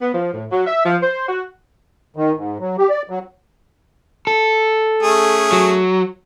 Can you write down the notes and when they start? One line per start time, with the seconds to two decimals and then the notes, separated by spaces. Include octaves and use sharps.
0.01 B3
0.13 F3
0.33 A2
0.51 F#3
0.67 E5
0.85 F3
1.03 C5
1.28 F#4
2.16 D#3
2.36 G#2
2.60 F#3
2.78 G4
2.90 D5
3.10 F#3
4.27 A4
5.03 A3 C#4 G#4
5.52 F#3